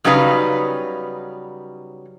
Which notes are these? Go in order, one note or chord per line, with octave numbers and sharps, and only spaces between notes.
C#3 F#3 G3 D#4 B4 F5